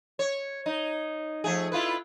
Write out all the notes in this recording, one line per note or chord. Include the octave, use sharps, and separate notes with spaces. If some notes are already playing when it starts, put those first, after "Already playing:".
C#5
D#4
F3 A3 G#4
E4 F4 B4